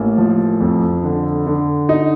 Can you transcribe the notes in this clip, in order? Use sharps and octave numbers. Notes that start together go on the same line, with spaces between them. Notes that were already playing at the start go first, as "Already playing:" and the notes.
Already playing: A1 A#3
F3
F2
D3
D3
D#4